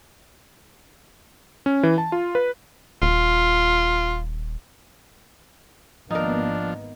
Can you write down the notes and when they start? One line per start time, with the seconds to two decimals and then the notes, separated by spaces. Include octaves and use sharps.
1.66 C#4
1.83 E3
1.98 A5
2.12 F4
2.35 B4
3.02 D#1 F4
6.11 G#1 F3 A#3 B3 D4 D#4 A#4